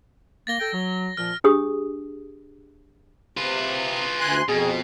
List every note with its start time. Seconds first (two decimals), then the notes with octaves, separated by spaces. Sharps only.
0.47 A#3 A6 A#6 G7
0.59 A4 G5
0.73 F#3
1.17 A#2 F3 F6
1.44 D4 G4 G#4 D#6
3.37 C3 F4 B4
4.20 D2 G#5 C6 F#6
4.49 F2 B2 G#4